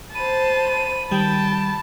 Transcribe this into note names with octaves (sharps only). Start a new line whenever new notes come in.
C5 A5 B5 D#7
D#3 G3 G5 A5